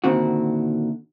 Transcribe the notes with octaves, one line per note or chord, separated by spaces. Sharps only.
A#2 D3 D#3 C4 E4 F#4